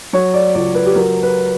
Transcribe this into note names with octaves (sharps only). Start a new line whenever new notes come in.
F#3 C#5
D5
C#2 D5
B4
G4
F#3 A#4
B4